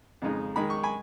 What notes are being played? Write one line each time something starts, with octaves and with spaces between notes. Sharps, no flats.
F2 C#3 G#3 D#4
D#3 G#3 D#4 B5
C#6
G#5 B5